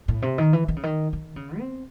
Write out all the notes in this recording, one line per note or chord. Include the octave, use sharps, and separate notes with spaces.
A2
C3
D#3
E3
D#3
C#3
D#3
D#3
C#3
C4